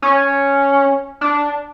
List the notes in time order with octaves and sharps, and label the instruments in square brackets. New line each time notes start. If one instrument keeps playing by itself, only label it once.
[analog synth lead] C#4
D4